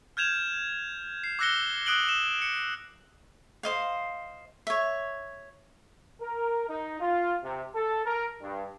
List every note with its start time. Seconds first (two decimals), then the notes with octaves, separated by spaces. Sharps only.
0.17 F6 G6 G#6 E7 F7
1.24 C7
1.39 D6 E6 F#6 A#6 C#7 G7
1.86 D#6 F#6 D7 F#7 G7
2.09 E7
2.42 C#7
3.63 C5 D#5 F5
4.67 C#5 E5
6.21 A#4
6.68 D#4
6.99 F4
7.42 C3
7.74 A4
8.05 A#4
8.41 G2